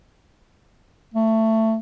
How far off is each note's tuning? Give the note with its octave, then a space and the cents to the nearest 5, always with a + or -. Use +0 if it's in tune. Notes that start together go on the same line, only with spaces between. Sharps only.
A3 +15